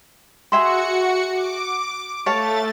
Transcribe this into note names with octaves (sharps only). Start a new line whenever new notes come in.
F#4 G#4 E5 C6 C#7
D6
A3 C#5 F5 A5 A6